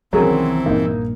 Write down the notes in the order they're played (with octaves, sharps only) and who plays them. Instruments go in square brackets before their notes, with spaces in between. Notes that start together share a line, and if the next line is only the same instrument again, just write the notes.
[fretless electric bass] C2 D#3 C#4 [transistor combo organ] E3 [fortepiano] F#3 G#4 A#4 [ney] C4
[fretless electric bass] A#1 G2 A#2 [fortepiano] A#3 D#4